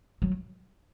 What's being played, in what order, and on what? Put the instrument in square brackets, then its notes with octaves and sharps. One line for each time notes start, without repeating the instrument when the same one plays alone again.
[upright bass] F#3